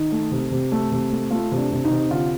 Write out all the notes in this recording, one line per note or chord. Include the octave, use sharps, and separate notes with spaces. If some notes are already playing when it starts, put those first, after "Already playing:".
Already playing: D#3 D#4
A3
C3
C3
A3
C3
A3
A3 F4
C3
D4
C3
D#4
C3
D3 F4